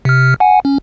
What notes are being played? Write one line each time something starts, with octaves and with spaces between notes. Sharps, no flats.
C3 F6
F#5 G#5
C#4